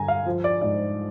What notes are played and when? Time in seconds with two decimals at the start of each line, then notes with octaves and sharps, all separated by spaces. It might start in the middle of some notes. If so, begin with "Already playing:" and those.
Already playing: G2 D3 G#5 A#5
0.08 F5
0.26 F3
0.44 D5
0.61 G#2 D5